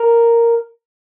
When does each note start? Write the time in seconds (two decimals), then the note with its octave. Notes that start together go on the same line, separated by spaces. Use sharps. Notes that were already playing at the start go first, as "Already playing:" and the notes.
Already playing: A#4